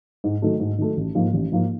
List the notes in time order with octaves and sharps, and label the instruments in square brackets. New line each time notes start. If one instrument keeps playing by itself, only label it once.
[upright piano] G#2
D#3 F#3 A3
G#2
D#3 F#3 A3
A1
G#2 F3 A#3
A1
G#2 F3 A#3